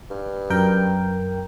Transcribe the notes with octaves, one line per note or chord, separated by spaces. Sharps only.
G2
F#2 A#4 G5